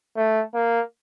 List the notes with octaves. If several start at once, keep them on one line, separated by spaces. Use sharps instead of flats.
A3
A#3